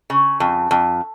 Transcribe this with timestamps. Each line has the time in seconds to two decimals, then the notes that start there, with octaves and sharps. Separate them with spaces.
0.10 C#3
0.40 F2
0.71 F2